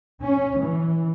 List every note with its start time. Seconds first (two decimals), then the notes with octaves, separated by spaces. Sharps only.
0.24 C#4
0.63 E3